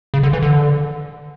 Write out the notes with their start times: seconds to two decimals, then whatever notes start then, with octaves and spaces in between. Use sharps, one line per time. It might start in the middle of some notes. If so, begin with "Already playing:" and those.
0.14 C#3
0.23 D3
0.33 E3
0.43 D3